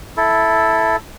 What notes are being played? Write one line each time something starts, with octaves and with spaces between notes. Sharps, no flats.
E4 A4